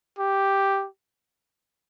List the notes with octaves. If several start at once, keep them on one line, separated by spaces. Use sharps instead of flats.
G4